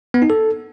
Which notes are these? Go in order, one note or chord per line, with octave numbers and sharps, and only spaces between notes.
B3
D#4
A4